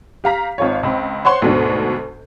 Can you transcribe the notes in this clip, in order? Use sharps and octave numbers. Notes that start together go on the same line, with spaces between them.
G4 F5 A#5 B6
G#1 F4 C#5
C#2 C4 B5
C5 C#5 F#5 C6
D2 G#2 B2 D4